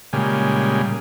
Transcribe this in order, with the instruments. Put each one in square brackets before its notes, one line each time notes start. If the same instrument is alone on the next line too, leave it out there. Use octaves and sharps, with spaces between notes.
[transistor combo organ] A#2 C#3 G3 G#3